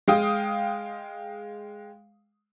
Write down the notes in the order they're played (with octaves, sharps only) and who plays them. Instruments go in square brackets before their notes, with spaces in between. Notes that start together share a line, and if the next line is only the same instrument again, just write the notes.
[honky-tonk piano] G#3 F5 G5 D#6